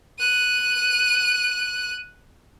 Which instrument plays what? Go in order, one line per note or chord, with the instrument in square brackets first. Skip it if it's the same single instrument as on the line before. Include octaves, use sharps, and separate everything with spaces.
[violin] F#6 D#7